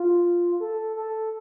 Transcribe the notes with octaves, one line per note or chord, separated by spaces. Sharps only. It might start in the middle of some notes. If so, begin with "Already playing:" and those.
Already playing: F4
A4
A4